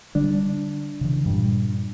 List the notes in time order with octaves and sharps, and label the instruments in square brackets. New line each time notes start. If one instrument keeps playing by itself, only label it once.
[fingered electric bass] D3 G3 [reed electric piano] D4
[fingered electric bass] C#3 E3
G2 A#2